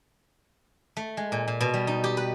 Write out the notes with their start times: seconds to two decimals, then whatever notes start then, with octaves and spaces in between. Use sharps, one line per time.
0.97 A3
1.17 G#3
1.32 A#2
1.48 A#2
1.61 B2
1.74 G3
1.87 D#4
2.04 G4
2.17 B4